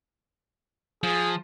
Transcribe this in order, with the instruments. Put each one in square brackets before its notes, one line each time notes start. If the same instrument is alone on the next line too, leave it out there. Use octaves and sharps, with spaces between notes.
[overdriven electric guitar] F3 [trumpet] G#4